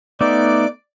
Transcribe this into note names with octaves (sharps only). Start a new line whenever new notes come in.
A3 B3 D#4 D5 D6